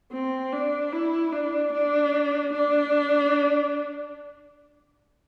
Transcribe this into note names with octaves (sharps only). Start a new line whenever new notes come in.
C4
D4
E4
D4
D4
D4